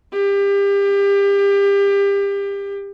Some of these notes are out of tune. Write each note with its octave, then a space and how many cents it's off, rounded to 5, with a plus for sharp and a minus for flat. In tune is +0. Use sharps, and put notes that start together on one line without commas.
G4 +30